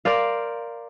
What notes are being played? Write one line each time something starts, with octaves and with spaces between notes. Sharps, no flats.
A#4 C5 D5 F5